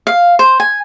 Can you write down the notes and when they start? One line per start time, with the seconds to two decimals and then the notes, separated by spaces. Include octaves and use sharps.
0.07 F5
0.39 C5
0.60 G#5